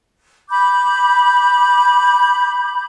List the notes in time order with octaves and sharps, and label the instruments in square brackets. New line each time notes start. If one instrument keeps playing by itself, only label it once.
[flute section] B5 D6 G6